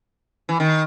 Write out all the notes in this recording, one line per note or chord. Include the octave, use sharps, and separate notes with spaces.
E3
D#3